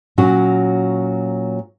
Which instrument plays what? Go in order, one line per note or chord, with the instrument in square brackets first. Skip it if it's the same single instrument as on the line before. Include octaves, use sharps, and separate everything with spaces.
[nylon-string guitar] A#2 F#3 C#4 F#4